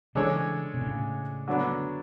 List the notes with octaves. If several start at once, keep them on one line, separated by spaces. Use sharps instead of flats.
C#3 E3 G#3 D4 A4 C#5
B2
A2 C#3
D3 F#3 B3 D4